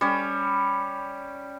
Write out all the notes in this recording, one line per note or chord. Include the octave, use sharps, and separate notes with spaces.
G3 C#4